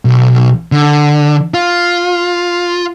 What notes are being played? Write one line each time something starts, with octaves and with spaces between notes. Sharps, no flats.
B1
D3
F4